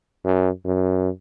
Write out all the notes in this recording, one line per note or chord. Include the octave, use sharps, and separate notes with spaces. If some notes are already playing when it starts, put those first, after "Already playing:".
F#2
F#2